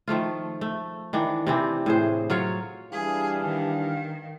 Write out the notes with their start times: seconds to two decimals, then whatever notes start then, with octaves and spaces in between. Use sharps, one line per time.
0.08 D#3 F3 A3 F4
0.61 A3
1.13 D#3 E3 D4
1.47 C3 E3 C4 D4
1.86 A2 G#4 C5
2.30 F#3 F4 C#5
2.92 E3 G3 D4 G#4 F5
3.43 D#3